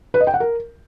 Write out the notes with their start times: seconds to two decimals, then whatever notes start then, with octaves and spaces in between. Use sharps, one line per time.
0.14 B4
0.21 D#5
0.27 G5
0.34 F#5
0.40 A#4